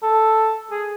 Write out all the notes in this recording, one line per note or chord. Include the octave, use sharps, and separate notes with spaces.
A4
G#4